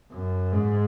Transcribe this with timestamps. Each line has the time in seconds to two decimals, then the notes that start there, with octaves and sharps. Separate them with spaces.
0.13 F#2
0.53 G#2